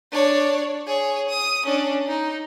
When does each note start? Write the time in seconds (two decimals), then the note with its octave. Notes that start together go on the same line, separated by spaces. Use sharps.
0.12 D4 C#5
0.87 G#4 C#5
1.29 D#6
1.66 C#4 D4
2.07 D#4